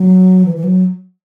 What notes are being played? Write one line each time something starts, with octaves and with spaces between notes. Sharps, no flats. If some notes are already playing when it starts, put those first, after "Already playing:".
Already playing: F#3
E3
E3
F#3